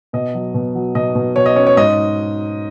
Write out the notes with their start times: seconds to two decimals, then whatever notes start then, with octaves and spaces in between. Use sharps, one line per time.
0.13 B2 D#5
0.34 F#3
0.54 B2
0.75 F#3
0.95 B2 D#5
1.15 B2
1.36 B2 C#5
1.46 D#5
1.56 C#4 C#5
1.67 C#5
1.77 G#2 D#5